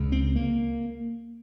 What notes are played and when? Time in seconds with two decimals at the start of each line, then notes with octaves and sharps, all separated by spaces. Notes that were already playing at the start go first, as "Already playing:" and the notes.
Already playing: C#2 C#3
0.12 C4
0.36 A#3